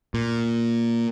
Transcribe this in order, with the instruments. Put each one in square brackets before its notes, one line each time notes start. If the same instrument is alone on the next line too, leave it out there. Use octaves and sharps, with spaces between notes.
[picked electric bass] A#2